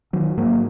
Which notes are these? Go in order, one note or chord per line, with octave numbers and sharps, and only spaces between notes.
D#3 F#3
G#2 F#3 A#3